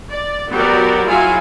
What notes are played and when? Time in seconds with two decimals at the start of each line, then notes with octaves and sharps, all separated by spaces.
0.11 D5
0.51 F#3 B3 G4 A#4 D5
1.06 F#3 E4 F4 G#4 F5 G#5